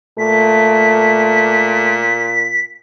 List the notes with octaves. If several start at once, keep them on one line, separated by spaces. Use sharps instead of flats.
A#2 A3 B6